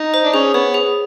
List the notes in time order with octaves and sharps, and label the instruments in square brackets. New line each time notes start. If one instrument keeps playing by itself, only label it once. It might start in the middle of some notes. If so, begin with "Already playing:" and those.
Already playing: [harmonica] D#4
[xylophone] C5
[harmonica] D4
[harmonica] C#4 [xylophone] G#4
[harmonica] B3 [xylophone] C#5
[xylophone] G#4